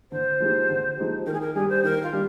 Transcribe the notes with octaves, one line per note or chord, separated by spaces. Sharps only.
D3 C5
F3 G#3 D#4 G4
D3
F3 G#3 D#4 G4
D#3 A#4
G#4
A#4
G3 D4 G4 G#4
C5
D#3 A#4
F4
G3 D4 G4